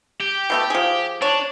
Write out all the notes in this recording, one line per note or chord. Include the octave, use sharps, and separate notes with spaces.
G4
B2 A3 B3
F3 G#4
D4 C#5